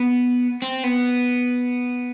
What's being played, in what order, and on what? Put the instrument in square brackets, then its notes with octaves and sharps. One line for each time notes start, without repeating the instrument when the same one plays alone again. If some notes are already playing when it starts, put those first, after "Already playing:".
Already playing: [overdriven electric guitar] B3
C4
B3